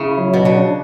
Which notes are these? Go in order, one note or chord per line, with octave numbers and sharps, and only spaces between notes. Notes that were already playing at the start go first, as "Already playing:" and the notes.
Already playing: C#3 E4
F#3
B2
C#3 D4